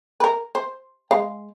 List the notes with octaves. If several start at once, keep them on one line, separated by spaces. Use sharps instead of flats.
A#4 B4
C5
G#3 F5